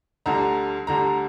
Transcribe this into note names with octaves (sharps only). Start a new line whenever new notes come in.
D2 D3 G3 A#5
D2 D3 G3 A#5